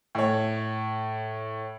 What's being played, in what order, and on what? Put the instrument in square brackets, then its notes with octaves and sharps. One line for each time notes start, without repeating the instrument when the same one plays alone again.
[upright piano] A2 C#5